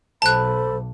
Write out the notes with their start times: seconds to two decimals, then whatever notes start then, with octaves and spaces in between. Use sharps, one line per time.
0.22 B1 A4 C5 A5 B5 F#6